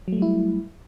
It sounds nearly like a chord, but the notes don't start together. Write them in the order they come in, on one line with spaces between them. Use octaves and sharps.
F#3 A3 G3 E4